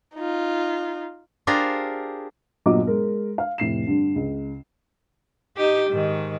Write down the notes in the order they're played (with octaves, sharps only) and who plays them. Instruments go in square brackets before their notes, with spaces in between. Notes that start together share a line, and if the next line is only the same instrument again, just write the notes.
[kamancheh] D#4 F4
[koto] D4 F4 G4 G#4 A#4 C5
[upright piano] G1 A#2 F#3 D#5 D6
G#3 A#4
F5
F1 A2 C7 E7
G2 D3
C#2
[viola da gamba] D#4 G4
G#2 D#3